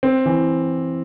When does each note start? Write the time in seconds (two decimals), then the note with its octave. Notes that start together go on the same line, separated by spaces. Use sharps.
0.03 C4
0.26 E3